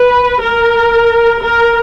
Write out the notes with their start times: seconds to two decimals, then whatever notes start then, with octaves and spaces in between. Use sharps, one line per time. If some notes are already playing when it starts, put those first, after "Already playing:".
Already playing: B4
0.42 A#4
1.42 A#4